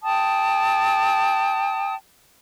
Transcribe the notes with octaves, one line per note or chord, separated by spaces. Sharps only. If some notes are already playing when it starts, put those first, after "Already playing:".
G5 A5 D#6